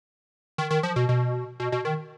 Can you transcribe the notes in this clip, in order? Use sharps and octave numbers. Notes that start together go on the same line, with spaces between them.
D#3
D#3
F3
B2
B2
B2
B2
D#3